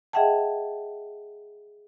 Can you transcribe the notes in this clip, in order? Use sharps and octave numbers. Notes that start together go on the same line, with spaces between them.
G#4 D#5 E5 F#5 G5 A5